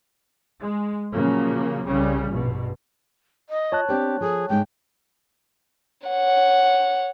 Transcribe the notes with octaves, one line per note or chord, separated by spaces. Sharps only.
G#3
A#2 C#3 F3 F#3 A#3
C2 C#3 G3 C#4
A#1 G2 B2
D#5
F4 C#5 A5 F#6
C4 D4 G4 C5
F3 G#4 A4
G#2 G#3 D#4 G5
C#5 F#5